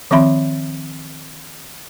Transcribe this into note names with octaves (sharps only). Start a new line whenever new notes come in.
D#3 F3 C4 E5 B5 C6